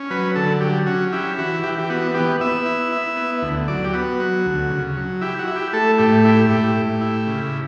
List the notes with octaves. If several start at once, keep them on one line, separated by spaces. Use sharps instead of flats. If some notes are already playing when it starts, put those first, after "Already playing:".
Already playing: C#4
F#3 B4
D3 A4
F#3 G4
C#4 F#4
E4 G4
E3 F#4
E3 G4
G4
B3 F#4
B3 G4
B3 E5
E4
E4
B3
D2
F#3 D5
G4
B3 F#4
F#3
D2
C#3
F#3
E4 G4
F#4
E4
G4
A3 A4
A2 G4
E4 G4
A2 G4
A2
E4
C#3